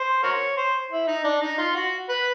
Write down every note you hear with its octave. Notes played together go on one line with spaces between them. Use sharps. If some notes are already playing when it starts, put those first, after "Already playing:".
Already playing: C5
F#4 A#4 C#5
C5
E4
D#4
D4
D#4
F4
F#4
B4